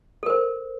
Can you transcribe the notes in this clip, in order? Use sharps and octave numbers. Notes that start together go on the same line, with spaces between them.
A4 A#4 C5